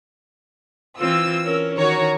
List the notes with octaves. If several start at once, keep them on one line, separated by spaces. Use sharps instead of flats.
E3 C4 F4 E6
C#4 A#4
D#3 F#4 C#5 A#5